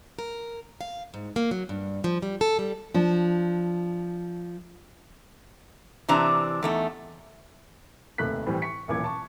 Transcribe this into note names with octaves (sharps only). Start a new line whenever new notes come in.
A#4
F5
G#2
A#3
F#3
G2
F3
G3
A4
G3
F3 D4
C3 E3 D4 A#5
E2 A3 D#4
F1 D#2 A3 F#6 B6
A2 E3 G3 C4
C#6 B6 C#7
D#1 B1 A#2 E3 D6 G#6
A5 C#6